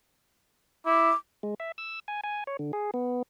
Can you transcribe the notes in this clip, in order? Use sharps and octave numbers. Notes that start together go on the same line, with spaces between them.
E4 D6
G#3
E5
E6
G#5
G#5
C#5
D3
G#4
B3